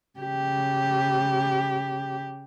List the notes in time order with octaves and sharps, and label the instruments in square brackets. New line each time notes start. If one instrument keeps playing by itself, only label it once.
[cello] C#3 G4